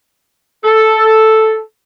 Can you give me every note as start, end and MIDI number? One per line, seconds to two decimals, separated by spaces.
0.65 1.61 69